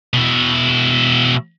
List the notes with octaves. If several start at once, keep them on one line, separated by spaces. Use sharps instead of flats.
B2 E4